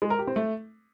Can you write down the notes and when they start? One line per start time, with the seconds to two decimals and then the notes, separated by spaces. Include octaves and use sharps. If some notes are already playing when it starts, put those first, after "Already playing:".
0.02 G#3
0.10 A#4
0.19 G4
0.27 C4
0.36 A3